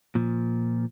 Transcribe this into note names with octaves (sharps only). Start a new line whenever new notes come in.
A#2 F3